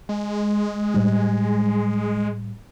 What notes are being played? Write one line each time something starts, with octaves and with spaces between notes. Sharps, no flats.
G#3
A2 G3